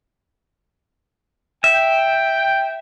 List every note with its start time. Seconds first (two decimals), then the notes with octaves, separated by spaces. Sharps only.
1.64 E5 G5